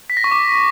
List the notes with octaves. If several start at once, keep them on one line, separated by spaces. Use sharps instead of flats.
B6
A#6
C#6
D6